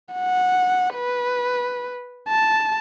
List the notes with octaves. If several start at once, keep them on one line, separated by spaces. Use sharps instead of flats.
F#5
B4
A5